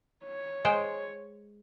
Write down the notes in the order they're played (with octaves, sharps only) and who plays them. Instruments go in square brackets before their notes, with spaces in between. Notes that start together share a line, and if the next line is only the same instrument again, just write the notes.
[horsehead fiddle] C#5
[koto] G#3 C5 G5